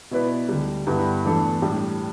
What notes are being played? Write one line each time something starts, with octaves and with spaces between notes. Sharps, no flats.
B2 B3 E4 B4 D5
D2 D3 G3
G2 D3 B3 E4 G4
E2 E3 A3 D4 A4
A2 G3 D4